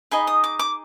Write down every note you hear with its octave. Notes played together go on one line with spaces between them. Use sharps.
D#4 G#4 D#5 B5
D#6
D6
D6